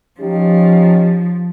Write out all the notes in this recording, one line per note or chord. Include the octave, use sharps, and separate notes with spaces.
F3 C#4 D#4 G4